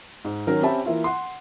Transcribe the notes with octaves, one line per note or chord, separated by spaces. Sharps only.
G#2
D#3 F#3 C#4 A#4
C4 C#4 G4 E5 A5 B5
E3 A#3 E4 F4
F#5 C6